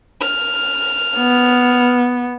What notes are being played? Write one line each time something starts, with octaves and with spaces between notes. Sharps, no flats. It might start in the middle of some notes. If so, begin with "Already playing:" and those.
F6
B3